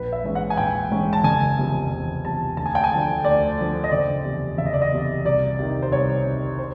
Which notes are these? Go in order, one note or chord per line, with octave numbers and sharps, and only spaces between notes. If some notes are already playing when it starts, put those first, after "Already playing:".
Already playing: A#1 B4
E5
G#2 E3 G#3 C#4
F#5
G#5
A#1 G5
G#2 E3 G#3 C#4
A5
F#1 G#5
E2 C3 F3
F#1
E2 C3 F3 A5
D2 A5
G#5
G5
G#5
D3 F3
D2 D5
D3 F3
D#5
F#1 D5
E2 C3
F#1 E5
D#5
D5
D#5
E2 C3
C2 D5
C3 D#3
C5
C2 C#5
C3 D#3
C5